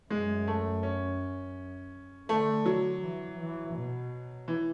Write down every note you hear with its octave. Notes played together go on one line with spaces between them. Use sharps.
F#2 G#3
A3
C#4
D3 A3
F#3
E3
E3
B2
E3